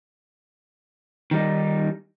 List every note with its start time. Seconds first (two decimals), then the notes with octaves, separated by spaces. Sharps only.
1.31 D#3 G3 D#4